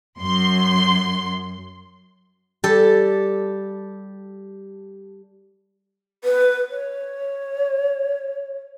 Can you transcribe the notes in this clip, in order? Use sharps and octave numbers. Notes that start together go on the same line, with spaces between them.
F#2 C6
G3 G4 A4
B4
C#5